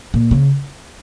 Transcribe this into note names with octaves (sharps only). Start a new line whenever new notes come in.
A#2
C#3